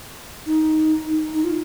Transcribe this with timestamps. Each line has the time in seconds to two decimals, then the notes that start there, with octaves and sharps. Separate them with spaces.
0.46 D#4
1.34 D#4
1.44 F4